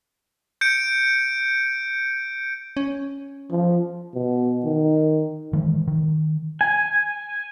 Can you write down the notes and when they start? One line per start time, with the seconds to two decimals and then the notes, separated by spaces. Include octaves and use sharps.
0.61 G6 C#7 D7
2.77 C#4
3.50 F3
4.14 B2
4.64 D#3
5.53 D#3 E3 G#3
5.87 D#3
6.61 G#5